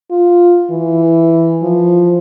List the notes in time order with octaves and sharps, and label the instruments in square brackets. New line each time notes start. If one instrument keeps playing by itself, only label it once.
[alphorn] F4
E3
F3